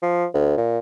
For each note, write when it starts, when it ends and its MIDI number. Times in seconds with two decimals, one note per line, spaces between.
0.02 0.26 53
0.34 0.56 38
0.58 0.79 46